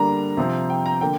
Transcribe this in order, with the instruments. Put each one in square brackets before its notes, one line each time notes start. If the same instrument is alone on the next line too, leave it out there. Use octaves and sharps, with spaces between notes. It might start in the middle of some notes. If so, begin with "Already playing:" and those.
Already playing: [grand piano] D3 G3 A#3 D4 A#5
C3 F3 C4
G5
A#5
D3 A#3 G5